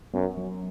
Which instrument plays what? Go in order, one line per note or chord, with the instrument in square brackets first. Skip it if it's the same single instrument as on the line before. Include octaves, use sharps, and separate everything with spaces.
[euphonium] F#2 [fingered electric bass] B3
[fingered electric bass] F#3